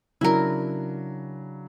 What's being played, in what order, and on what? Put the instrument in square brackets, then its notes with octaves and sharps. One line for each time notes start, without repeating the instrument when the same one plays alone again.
[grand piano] C#3 F#3 D4 [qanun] E4 A#4